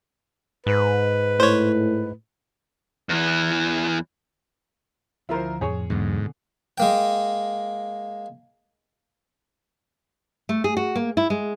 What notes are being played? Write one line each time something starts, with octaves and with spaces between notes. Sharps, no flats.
G#2 B4
A2 C5 C#5
E2 E3
D2 F3 E4 F4 A#4 C5
F2 A2 G#4 C#5
E2 G#2 B2 D3 F#3
G#3 A#3 G5
A3
G#4
F#4
A#3
E4
G#3